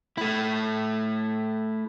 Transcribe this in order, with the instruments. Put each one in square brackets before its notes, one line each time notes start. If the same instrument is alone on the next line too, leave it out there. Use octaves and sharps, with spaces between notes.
[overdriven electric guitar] A3 E4